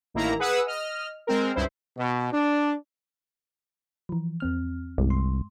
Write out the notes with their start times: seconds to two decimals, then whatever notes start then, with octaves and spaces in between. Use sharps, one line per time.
0.14 A1 D#3 A#3 E4 A#5
0.39 G#4 B4 F#5 D#6 E6
0.67 D#5 F6
1.27 G#3 C4 A#4
1.55 C#2 G2 E4 C5
1.97 B2
2.32 D4
4.09 E3 F3
4.40 E2 C4 F6
4.98 C2 G2 G#3
5.10 C6